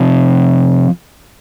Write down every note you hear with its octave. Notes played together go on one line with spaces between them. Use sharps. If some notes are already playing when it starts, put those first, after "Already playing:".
Already playing: C3 F3 C4